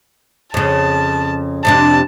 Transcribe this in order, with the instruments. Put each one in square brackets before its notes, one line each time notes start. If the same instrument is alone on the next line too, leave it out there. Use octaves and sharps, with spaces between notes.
[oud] F2 C#3 [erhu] A5
[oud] F2 C3 D4 [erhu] A5